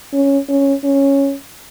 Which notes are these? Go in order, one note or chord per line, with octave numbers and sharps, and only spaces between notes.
C#4
C#4
C#4